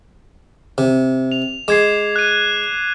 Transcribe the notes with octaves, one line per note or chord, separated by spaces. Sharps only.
C3
F7
G#3 D6 G#6 C7
F#6 D#7